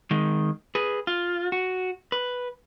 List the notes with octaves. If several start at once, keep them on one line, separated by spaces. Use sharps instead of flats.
D#3 G#3
G#4 B4
F4
F#4
B4